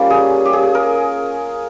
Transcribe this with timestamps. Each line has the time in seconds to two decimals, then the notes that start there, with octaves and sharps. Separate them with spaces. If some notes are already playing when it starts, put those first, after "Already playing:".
Already playing: G3 A#3 C#4 F4
0.10 G#4
0.45 G4
0.53 G#4
0.75 A#4